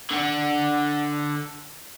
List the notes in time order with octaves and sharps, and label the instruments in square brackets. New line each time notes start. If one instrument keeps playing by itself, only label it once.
[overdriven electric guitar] D3 F#5